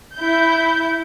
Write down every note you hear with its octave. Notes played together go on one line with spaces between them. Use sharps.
E4 G6